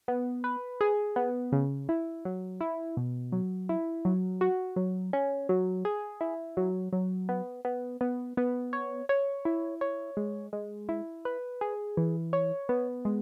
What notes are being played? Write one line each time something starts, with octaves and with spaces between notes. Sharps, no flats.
B3
B4
G#4
B3
C#3
E4
F#3
E4
B2
F#3
E4
F#3
F#4
F#3
C#4
F#3
G#4
E4
F#3
F#3
B3
B3
B3
B3
C#5
C#5
E4
C#5
G#3
G#3
E4
B4
G#4
E3
C#5
B3
G#3